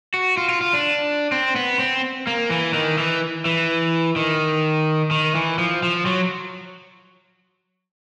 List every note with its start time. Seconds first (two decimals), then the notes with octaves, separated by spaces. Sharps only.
0.14 F#4
0.37 F4
0.49 F4
0.61 F4
0.73 D4
1.32 C4
1.56 B3
1.79 C4
2.27 A#3
2.50 E3
2.74 D#3
2.98 E3
3.45 E3
4.16 D#3
5.11 D#3
5.35 E3
5.58 F3
5.83 F3
6.06 F#3